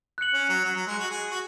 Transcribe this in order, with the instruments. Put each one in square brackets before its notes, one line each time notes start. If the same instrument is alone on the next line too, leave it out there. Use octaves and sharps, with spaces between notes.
[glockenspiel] F#6 C#7 F#7
[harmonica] C#4
F#3
F#3
F#3
G#3
F#4
G#4
F#4